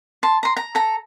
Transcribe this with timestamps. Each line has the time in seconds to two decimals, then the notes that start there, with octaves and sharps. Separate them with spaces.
0.23 A5 C6
0.43 A#5 C6
0.57 A#5
0.75 A4 A#5